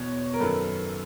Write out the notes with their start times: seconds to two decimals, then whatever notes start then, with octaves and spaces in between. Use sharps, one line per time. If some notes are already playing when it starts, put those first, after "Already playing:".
Already playing: E2 B2 C#5
0.34 A#4
0.40 F#2 D#3 A4 B4